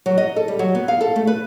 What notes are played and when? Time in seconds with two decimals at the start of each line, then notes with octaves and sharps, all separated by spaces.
0.06 F#3
0.18 D#5
0.36 A4
0.48 G3
0.59 F#3
0.75 B3
0.88 F5
1.01 A4
1.16 A3
1.27 B4